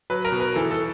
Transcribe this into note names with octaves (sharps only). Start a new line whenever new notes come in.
F#3 B4
A#4
B2
B4
E3 A4
A4